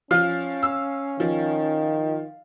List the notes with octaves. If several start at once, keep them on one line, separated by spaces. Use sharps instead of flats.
F3 C#4 F5
E6
D#3 F3